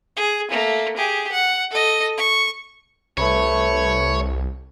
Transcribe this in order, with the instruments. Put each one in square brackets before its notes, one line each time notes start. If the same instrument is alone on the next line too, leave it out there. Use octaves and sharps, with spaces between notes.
[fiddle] G#4
A3 A#3
G4 G#4
F#5
A4 D#5
C#6
[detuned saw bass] C2 [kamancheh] A3 B4 [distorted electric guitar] C#5